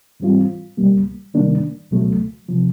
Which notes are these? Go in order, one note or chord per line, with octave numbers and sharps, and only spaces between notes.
G#2 E3 G3 C4 F4
C#2 B2 G3 A#3
C3 D#3 G3 A#3 D4
C#2 B2 F#3 A3
C3 F3